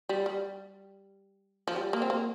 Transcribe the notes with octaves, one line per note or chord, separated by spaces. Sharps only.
G3
G3
F3
G3
A#3
C4
A#3